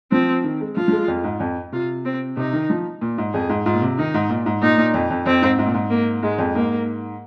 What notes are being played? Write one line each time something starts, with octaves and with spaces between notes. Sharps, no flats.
F3 C4
D#3
G#3
F3 F4
F3
G#3
F2
G#2
F2
C3 F4
C4
C3 D#4
D#3
F3
A#2
G#2
F2 G#4
G#2
G#2 F4
A#2
C3
D#3 D#4
G#2
A#2
G#2
A#2 D#4
A#2
F2
F2
F2 C4
G#2
G#2
A#2
G#2
A#3
G#2 G#3
F2
G#2 A#3